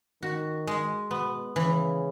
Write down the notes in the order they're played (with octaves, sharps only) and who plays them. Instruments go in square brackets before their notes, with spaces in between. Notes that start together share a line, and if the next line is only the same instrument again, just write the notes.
[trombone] D#3 [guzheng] F#4
[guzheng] G#3
[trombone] B2 [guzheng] B3
[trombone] C#3 [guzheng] E3